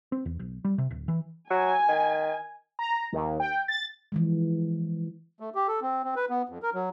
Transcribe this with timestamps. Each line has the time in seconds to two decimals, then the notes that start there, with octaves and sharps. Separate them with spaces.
0.12 C4
0.26 E2
0.39 B1
0.65 G3
0.78 C3
0.91 D1
1.08 E3
1.50 F#3 G#5
1.88 D#3
2.79 A#5
3.12 D#2
3.40 G5
3.68 A6
4.12 E3 F3 G#3
5.40 A3
5.55 G4
5.68 A4
5.82 C4
6.04 C4
6.16 B4
6.30 B3
6.49 F2
6.63 A#4
6.74 F#3